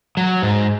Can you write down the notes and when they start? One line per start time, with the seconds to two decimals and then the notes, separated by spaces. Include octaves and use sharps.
0.17 F#3
0.42 G#2